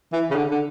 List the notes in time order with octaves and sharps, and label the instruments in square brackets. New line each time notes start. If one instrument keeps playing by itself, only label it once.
[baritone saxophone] E3
C#3
D3
D3